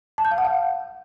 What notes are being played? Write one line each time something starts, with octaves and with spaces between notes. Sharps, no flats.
A5
G6
F5
F#5
F5